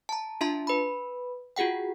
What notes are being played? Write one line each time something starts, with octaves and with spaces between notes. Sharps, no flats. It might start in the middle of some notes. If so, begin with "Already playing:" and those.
A5 A#5
D4 F4 E5 A5 A#5 C6
B4 B5
F4 F#4 G#4 F#5 G5